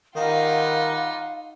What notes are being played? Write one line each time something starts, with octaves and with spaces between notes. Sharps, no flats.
D#3 G3 D#4 F4 F5 F#5